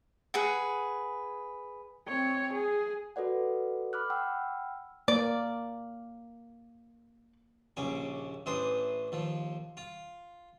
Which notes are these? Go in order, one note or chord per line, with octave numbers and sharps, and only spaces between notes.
G#4 B4 F#5
C4 C#5
G#4
F#4 A4 B4 D5 F#5
B5 D6 F6 F#6
F#5 G5 B5 E6 F6
A#3 D5
A#1 D#2 C#3 C#4 D6
A1 E3 D4 C5 C6 D#6
D#2 F3
F4